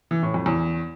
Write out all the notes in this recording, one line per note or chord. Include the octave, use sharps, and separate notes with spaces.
E3
A2
F2
E2